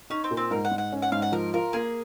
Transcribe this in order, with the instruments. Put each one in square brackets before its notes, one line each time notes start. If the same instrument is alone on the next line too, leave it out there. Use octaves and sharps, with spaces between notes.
[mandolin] C#4 [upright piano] D#4
[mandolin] C4
[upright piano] A#2
[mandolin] C4
[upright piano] G#2 [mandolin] A#4
[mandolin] F#5
[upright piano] G#2
[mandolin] F#5
[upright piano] C#4
[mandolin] F#5
[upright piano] G#2 [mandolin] F5
[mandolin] F#5
[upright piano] F3 [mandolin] A#4
[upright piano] F4 [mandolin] A#4
[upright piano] A#3 [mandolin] G#4